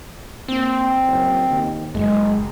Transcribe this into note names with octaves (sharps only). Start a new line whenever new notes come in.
A#3 C4
F#1
D#2
F#1 G#3